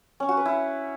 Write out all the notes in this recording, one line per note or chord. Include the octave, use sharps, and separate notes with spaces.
C#4
F#4
B4
E4